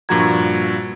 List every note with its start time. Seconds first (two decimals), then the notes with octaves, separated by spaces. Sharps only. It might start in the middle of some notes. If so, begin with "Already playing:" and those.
0.09 G2 A#2 F3 F#4 A#5 G#6